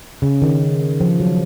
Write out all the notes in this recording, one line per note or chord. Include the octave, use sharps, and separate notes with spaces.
C#3
D#3
F3
F#3